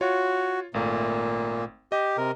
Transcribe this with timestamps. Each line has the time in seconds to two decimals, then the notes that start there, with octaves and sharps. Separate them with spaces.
0.01 F4 F#4 C#5
0.74 G#1 A#2 A3 A#3
1.92 G4 D#5
2.18 C3 A#4